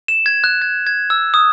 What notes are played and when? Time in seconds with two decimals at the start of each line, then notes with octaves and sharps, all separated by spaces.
0.08 E7
0.26 G#6
0.44 F#6
0.62 G#6
0.87 G#6
1.10 E6
1.34 D#6